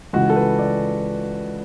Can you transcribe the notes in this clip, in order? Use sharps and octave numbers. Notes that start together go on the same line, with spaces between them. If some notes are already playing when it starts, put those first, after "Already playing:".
C#2 C#3 E3 G#3 F#4
A4
B4
D5